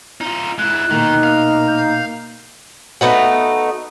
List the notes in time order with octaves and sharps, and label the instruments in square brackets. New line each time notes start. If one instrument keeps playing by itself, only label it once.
[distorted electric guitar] D#4 F4
[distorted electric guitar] G#3 E4 [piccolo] F#6
[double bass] B2 A#3 [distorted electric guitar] D#3 [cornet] D#4
[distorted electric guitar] F5
[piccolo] G6
[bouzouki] A3 B3 D#4 F#4